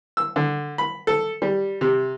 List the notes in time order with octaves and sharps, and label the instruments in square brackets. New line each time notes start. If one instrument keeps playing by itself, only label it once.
[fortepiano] E6
D3
B5
A4
G3
C3